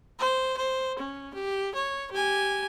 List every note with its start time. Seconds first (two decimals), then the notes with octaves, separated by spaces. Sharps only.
0.20 C5
0.57 C5
0.99 C#4
1.34 G4
1.75 C#5
2.12 G4 G#5